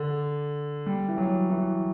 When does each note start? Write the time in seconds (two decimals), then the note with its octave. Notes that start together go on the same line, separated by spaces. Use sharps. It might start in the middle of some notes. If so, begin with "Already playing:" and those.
Already playing: D3
0.86 G3
1.09 E3
1.18 F#3
1.50 E3